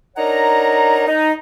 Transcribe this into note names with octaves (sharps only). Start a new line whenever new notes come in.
D4 D#4 A#4 C#5 F#5 A#5
D#4